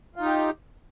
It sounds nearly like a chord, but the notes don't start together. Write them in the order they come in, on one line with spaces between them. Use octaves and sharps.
F4 D#4 G4